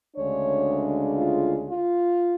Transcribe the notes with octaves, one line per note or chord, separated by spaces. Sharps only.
D2 C#3 G#3 D4 C#5
F4
F4